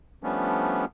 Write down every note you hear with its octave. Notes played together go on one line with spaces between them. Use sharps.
F3 G3 A3 B3 C#4 D4